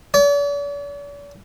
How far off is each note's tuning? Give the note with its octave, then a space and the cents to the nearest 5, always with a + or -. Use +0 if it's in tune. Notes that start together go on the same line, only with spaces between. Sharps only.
D5 -45